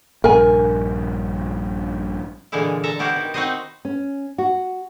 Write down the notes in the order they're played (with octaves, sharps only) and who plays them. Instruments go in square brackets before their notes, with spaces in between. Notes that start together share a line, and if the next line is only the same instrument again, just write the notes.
[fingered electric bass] A#1 G2 [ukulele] A#4 G#5
[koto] A#2 D3 E3 G#3 E4
A4 E5 A5 A#5
B3 E4 F#4 G4 A#4 C5
D#3
C4 D#4 F#4 B4 C5 D#5
[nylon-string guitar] C#4
F#4